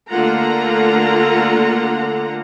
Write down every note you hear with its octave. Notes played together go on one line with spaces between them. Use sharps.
D3 A3 A#3 F4 F#5 A#5